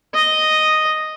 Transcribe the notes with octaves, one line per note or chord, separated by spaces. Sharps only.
D#5